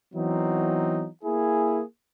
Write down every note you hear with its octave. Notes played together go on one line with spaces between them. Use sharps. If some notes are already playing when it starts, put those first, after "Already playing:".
E3 F#3 B3 C4 D#4
A#3 E4 G#4